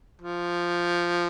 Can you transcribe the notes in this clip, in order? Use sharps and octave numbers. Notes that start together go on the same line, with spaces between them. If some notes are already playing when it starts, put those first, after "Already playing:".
F3